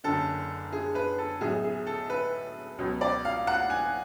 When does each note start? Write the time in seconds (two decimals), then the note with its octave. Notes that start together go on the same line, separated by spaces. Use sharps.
0.04 F#1 F#2 D3 A4
0.73 G#4
0.95 B4
1.18 A4
1.41 B1 A2 F#3 G#4
1.64 G#4
1.87 A4
2.10 B4
2.78 C#2 B2 F#3
3.01 D5
3.25 F5
3.47 F#5
3.70 G#5